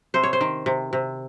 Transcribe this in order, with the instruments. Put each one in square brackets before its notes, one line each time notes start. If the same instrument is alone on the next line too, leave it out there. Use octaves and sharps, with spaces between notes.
[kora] C3 C5
C#5
C5
D#3
C3
C3